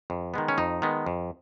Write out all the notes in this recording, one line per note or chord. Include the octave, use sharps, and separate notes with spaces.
F2
D#3 G#3 B3
C#4
F2 D#4
D#3 G#3 B3
F2